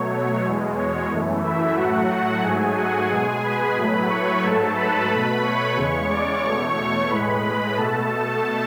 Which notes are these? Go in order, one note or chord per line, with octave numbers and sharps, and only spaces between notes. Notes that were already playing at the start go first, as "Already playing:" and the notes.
Already playing: B2 F#3 A3 C#5
E2 B2 G#3
C#5
F#2 E3 A3
E4 E5
A2 F#3 A3 F#4 F#5
G#2 F#3 A3 G#4 G#5
F#4 F#5
B2 G#3 G#4 G#5
B4 B5
A2 F#3 A3
C#5 C#6
G#2 F#3 A3 A4 A5
B4 B5
B2 A3
C#5 C#6
E2 C#3 G#3 C#5 C#6
D5 D6
E2 B2 A3 C#5 C#6
C#5 C#6
A2 G#3 B4 B5
B2 A3 A4 A5